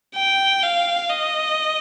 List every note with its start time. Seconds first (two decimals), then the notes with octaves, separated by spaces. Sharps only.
0.16 G5
0.63 F5
1.10 D#5